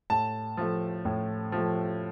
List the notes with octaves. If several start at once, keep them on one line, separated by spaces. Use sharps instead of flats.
A2 A5
F3 A3
A2
F3 A3